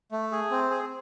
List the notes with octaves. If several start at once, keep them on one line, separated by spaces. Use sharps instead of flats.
A3
G#4
C4
G#4